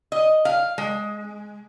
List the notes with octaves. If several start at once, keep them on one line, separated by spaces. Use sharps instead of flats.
D#5
F5
G#3